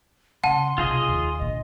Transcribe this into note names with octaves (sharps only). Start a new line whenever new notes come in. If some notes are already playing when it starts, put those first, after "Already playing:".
C#3 F#5 A5 C6
B1 C3 F4 G#4 D#5
D#2
A#2 D3 D#5